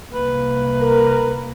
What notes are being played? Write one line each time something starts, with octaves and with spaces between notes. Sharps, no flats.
C2 A#3 B4
A#4